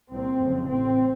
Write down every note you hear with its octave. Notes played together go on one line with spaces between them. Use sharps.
C2 A#2 C4
F#1 F2 C#3
A1 A2 C4